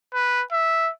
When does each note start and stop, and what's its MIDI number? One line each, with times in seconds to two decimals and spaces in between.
0.14 0.42 71
0.52 0.90 76